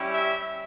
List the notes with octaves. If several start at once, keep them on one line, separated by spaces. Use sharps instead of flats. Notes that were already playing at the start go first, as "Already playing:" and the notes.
Already playing: G3 C#4 E4 G4
E5